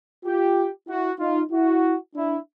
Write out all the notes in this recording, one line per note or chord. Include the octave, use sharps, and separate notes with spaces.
F4 G4
E4 F#4
D#4 F4
E4 F#4
D4 E4